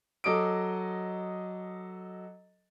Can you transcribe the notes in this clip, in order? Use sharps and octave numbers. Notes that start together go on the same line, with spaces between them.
F#3 A4 D#5 D6 D#6 D7